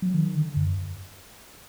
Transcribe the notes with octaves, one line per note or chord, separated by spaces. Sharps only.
F#3
D#3
D3
F#2